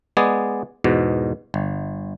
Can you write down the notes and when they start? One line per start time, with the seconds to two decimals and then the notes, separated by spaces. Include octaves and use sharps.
0.17 G#3 B3 G#4 D5
0.84 E2 G#2 B2
1.54 G1